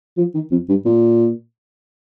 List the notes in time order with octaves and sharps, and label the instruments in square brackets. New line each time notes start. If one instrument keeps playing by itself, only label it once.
[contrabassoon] F3
D#3
F2
G2
A#2